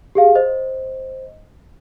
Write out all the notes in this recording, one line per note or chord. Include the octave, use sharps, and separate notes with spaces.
G4 G#4 F5
C5 D#5